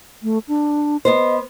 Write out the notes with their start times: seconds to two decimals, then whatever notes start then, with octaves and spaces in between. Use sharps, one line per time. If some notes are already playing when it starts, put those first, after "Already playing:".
0.23 A3
0.48 D4
1.05 B3 B4 C5 D#5